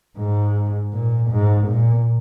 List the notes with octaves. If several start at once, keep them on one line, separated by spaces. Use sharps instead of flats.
G#2
A#2
G#2
A#2